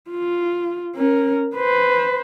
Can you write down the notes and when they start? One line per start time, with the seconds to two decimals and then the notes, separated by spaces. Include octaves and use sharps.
0.11 F4
0.96 C#4 A#4
1.56 B4 C5